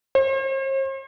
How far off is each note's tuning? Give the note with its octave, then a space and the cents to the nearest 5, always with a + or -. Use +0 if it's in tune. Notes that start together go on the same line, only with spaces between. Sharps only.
C5 +45